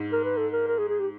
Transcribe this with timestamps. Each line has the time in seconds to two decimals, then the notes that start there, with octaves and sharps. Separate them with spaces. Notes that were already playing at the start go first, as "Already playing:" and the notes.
Already playing: G#2
0.13 A#4
0.24 B4
0.37 A4
0.52 A#4
0.67 A#4
0.78 G#4
0.89 G#4
1.00 G4